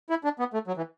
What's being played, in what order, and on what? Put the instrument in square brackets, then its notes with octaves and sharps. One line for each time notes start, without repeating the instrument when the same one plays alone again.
[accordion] E4
D4
B3
A3
F#3
E3